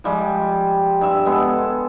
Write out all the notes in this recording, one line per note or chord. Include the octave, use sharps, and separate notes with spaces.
F3 G3 G#3
G2 E5
G#3 B3 A4